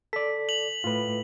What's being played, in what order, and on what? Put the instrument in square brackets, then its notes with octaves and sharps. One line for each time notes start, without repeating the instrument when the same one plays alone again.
[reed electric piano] A4 D5 [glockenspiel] B6
[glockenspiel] F7 [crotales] F#7
[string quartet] A2 [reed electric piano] F4 B4